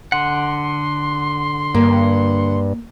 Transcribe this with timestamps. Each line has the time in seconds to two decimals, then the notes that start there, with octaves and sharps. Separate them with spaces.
0.12 D3 F#5 C6
1.75 G2 A#3